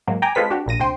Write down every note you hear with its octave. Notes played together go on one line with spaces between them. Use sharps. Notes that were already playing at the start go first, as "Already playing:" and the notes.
G#2 F#3 A#3
G5 G#5 A#5 D6
G#3 C4 F4 A4 B4 B6
D4 F#4 G4
A#1 A#2 A#6 D#7
D2 C3 C5 G5 C6